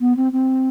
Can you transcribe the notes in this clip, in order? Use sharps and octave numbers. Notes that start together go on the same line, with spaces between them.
B3
C4
C4